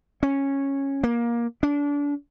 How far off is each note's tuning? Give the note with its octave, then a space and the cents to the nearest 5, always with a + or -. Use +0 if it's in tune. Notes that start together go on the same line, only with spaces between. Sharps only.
C#4 -10
A#3 +20
D4 -30